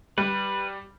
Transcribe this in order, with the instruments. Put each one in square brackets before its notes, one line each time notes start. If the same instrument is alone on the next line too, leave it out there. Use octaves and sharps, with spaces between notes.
[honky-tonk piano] G3 [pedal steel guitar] B4